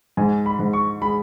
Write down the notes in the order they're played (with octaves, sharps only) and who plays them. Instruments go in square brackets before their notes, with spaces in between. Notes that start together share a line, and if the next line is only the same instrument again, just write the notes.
[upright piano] G#2 [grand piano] G#5
[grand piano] B5
[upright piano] G#2
[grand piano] C#6
[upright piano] G#3 [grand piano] B5